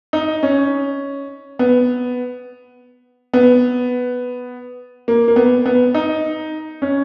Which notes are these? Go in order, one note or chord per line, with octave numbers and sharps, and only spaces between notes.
D#4
C#4
B3
B3
A#3
A#3
B3
B3
D#4
C#4